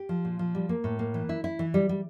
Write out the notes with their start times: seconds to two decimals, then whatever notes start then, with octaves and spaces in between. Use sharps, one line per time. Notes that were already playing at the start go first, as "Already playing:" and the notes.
Already playing: G4
0.09 F3
0.25 A#2
0.39 F3
0.55 G3
0.69 A#3
0.84 A2
0.99 A#3
1.14 E3
1.29 E4
1.44 E4
1.59 E3
1.74 G3
1.89 G3